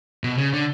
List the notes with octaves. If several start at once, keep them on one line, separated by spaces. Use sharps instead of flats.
B2
C#3
D3